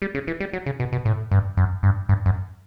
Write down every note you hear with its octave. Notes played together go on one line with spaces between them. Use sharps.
G3
C#3
E3
G3
F#3
C#3
B2
B2
A2
G2
F#2
G2
G2
F#2